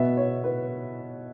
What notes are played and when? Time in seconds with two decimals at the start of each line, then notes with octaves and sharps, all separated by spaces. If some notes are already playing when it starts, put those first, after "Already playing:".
Already playing: B2 B3 E5
0.17 C#5
0.44 B4